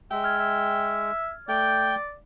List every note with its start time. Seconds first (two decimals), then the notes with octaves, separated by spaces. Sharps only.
0.11 G#3 E5 G5
0.24 F6 G#6
0.38 E5
1.49 A3 D5 G5 G6